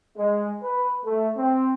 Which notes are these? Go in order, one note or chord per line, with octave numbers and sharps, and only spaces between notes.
G#3
B4
A3
C4